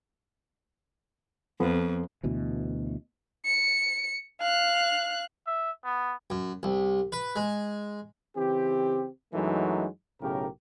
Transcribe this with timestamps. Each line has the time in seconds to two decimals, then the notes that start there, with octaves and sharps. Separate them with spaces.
1.60 F2 F3 B3 A4
2.24 D2 B2 E3
3.45 C#7
4.41 F5 F#6
5.47 E5
5.84 B3
6.30 F#2
6.63 C2
7.12 B4
7.36 G#3
8.37 C#3 E3 C4 G4
9.33 F#2 E3 F#3 G#3 A3 D#4
10.21 B1 A2 C#3 G4 A#4